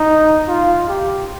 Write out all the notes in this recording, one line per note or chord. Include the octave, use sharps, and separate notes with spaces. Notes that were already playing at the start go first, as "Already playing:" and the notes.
Already playing: D#4
F4
G4